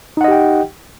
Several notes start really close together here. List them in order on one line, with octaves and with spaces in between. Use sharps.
D#4 F#5 D#5 G4 G5